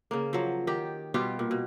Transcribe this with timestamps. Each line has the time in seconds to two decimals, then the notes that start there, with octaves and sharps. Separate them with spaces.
0.11 C#3 A#3
0.33 F3 F#3
0.67 D#3 G4
1.14 B2 G3 F4 G4
1.39 A#2
1.51 B2